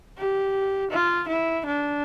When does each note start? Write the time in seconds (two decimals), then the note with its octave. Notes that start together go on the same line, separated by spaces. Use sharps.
0.18 G4
0.91 F4
1.28 E4
1.65 D4